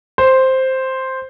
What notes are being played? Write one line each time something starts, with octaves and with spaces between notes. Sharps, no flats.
C5